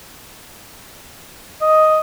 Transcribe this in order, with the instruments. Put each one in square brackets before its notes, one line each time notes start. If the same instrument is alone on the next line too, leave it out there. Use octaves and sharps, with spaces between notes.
[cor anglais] D#5